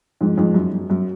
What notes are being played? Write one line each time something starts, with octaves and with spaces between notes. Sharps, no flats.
F2 G#2
F2 G#2
F#2
F#2
F#2